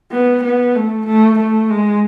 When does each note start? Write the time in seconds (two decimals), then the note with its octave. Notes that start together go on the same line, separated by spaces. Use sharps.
0.11 B3
0.43 B3
0.75 A3
1.06 A3
1.39 A3
1.70 G#3